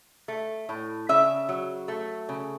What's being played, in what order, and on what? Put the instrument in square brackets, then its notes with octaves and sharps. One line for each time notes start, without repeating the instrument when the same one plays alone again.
[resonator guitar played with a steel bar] A3
A2
C#3 E5
F#3
A3
C#3